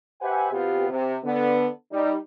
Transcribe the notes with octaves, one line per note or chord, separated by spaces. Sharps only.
G4 B4 C5 E5 F#5 G#5
B2 B3 C4 F4 G4
C3
D3 B3
G3 D#4